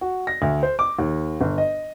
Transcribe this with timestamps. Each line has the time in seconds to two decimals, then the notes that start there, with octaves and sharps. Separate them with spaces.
0.01 F#4
0.27 A#6
0.42 D2
0.63 C5
0.79 D6
0.99 D#2
1.41 G1
1.58 D#5